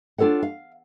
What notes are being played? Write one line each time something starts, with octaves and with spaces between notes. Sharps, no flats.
D4 F4 A4 C#5 F#5
F5